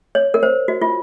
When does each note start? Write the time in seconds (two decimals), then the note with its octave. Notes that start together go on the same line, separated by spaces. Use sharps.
0.15 C#5
0.34 A#4
0.43 C5
0.68 F#4
0.82 F4